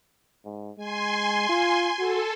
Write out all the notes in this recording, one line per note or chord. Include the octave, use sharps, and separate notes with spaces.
G#2
G#3 G#5 C6
F4
F#4 A4